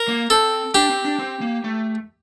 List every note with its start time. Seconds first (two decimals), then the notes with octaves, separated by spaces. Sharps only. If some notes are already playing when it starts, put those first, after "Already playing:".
Already playing: A#4
0.08 A#3
0.30 C4 A4
0.75 D4 G4
0.90 C4
1.05 D4
1.19 C4
1.41 A#3
1.64 A3